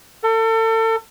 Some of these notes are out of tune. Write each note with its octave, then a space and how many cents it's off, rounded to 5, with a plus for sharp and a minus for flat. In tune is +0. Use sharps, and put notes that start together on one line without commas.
A4 +35